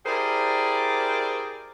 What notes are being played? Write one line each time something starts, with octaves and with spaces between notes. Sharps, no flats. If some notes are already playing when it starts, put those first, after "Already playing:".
E4 G4 G#4 A#4 C5 D5